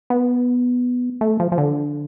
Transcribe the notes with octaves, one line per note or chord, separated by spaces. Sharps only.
B3
A3
F3
F3
D3